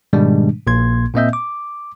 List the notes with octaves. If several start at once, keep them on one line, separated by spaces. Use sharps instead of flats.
G#2 B2 D#3 G3 G#3 D4
A#1 A#2 A#3 C6 G#6
A#2 A#3 C4 D#5 E5 G6
D6